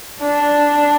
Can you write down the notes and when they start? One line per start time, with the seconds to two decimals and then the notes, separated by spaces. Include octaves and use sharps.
0.21 D4